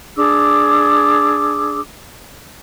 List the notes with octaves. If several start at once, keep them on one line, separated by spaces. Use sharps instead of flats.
D4 G#4 D6 E6